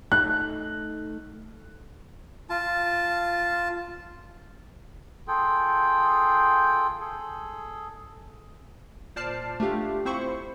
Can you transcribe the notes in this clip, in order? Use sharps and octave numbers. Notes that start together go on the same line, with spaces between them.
A3 D#4 A4 F#6
F4 A5
F4 G#4 A4 G5
G#4 A4
A#2 C5 D5 A5 F6 C7
A3 D4 F4 G4 F5
C4 E4 C5 B5 C#6 C#7